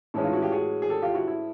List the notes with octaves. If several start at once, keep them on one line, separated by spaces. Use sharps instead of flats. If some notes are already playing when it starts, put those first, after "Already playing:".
A2 E3 G#3 C#4 E4
D#4 F4
E4 F#4
F4 G4
F#4 G#4
G#4
G4 A4
F4 G4
E4 F#4
E4